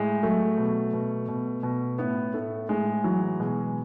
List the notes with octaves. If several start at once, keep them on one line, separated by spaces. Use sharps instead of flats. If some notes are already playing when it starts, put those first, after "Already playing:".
Already playing: A2 G#3
F#3 A3
B2
B2
B2
B2
A2 B3
A2 A3
A2 G#3
E3 F#3
B2 G#3